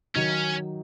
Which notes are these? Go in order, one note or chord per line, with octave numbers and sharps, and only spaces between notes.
D#3 F#3 C#4 D#4